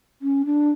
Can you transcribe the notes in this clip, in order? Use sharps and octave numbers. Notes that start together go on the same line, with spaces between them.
C#4
D4